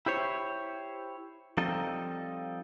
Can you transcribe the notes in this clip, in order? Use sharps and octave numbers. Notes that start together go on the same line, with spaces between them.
E4 G4 C5 C#5
F3 G3 C4 D#4 A4 D#5